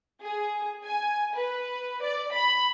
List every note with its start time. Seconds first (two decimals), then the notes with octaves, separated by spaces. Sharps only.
0.23 G#4
0.84 G#5
1.35 B4
2.03 D5
2.33 B5